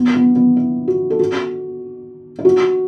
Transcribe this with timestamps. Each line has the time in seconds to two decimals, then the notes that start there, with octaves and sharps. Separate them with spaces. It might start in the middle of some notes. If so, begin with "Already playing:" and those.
Already playing: B3
0.15 B3
0.36 B3
0.57 E4
0.88 F#4
1.10 A4
1.19 F#4
2.39 E4
2.45 F#4